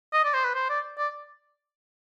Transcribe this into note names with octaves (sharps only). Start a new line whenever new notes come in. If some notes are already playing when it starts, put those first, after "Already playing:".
D#5
D5
C5
B4
C5
D5
D5